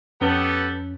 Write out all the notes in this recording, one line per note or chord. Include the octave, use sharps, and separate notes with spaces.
F2 B3 C#4 G4 A4